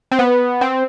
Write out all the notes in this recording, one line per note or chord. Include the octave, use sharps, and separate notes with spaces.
C4
B3
C4